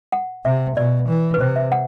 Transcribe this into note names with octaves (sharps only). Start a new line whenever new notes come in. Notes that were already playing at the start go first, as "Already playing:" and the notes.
F#5
C3 E5
B2 D5
E3
B4
C3 C5
E5
F#5